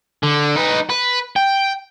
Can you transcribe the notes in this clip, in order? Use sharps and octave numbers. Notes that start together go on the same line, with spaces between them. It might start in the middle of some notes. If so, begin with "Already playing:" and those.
D3
D#4 B4
B4
G5